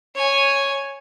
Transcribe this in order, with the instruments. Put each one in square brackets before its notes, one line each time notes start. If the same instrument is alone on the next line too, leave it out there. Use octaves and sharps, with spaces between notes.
[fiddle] C#5 G#5